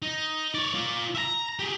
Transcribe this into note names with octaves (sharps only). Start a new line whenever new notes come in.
D#4
C#5 D5
F4 D5
E5 A#5
G4 G#4